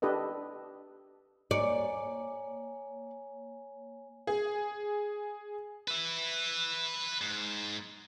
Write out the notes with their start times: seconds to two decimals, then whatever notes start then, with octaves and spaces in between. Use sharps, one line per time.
0.02 D4 G4 A4 B4 D#5
1.51 A#3 C#5 D5 G#5
4.27 G#4
5.88 B4 E5
7.21 G#2